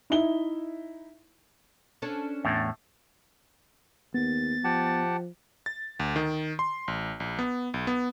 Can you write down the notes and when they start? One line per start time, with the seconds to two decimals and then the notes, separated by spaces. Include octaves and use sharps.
0.10 D#4 E4 E5 G7
2.02 C#4 D4 A4
2.44 E2 A2
4.14 D#2 B3 A6
4.64 F3 G4 F#5 A5
5.66 A6
6.00 D2
6.16 D#3
6.59 C6
6.88 A1
7.20 A#1
7.39 B3
7.74 B1
7.87 B3